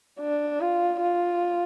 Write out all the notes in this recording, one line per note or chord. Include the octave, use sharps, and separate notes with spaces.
D4
F4
F4